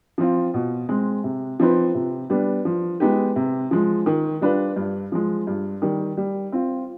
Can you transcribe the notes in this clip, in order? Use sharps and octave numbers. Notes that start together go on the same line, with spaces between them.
F3 C4 F4
B2
G#3 C4
C3
F3 C4 D#4 B4
C3
G3 B3 D4
F3
G#3 B3 D#4 G4
C3
F3 G#3
D#3
G3 D4 F4 B4
G2
F3 G#3
G2
D#3 G3
G3
C4 F4